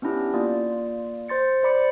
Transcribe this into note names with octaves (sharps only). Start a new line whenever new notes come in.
B3 C#4 D4 E4 G4
A#3 F4 D5
C5 C6 A6 C#7
C5 D5 B5 D6 C#7